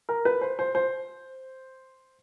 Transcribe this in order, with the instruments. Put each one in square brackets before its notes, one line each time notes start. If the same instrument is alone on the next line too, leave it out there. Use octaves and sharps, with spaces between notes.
[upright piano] A#4
B4
C5
C5
C5